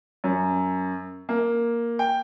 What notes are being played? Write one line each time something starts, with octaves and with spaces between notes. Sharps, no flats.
F#2
A#3
G5